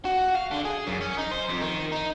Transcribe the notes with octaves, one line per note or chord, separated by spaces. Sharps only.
F#4
F5
D3
G#4
F#2
C#4
D#4
C5
F2
D#3
D#4